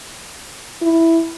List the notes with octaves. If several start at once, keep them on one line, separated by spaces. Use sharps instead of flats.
E4